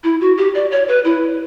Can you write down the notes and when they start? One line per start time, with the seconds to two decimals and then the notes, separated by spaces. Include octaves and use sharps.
0.04 E4
0.21 F#4
0.37 G4
0.54 D5
0.71 C#5
0.88 B4
1.05 E4